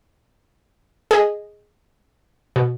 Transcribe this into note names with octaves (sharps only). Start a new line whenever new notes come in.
G#4 D#5
B2